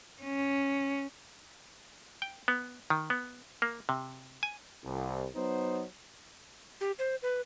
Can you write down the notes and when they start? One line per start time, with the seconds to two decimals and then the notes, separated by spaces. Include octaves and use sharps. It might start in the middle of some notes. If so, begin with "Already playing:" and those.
0.23 C#4
2.22 G5
2.48 B3
2.90 D#3
3.10 B3
3.62 A#3
3.89 C3
4.43 G#5
4.84 C2
5.35 F#3 B3 D#4 C5
6.81 G4
6.99 C5
7.22 B4